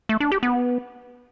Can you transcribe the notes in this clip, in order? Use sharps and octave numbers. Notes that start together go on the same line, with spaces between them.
A3
D4
G4
B3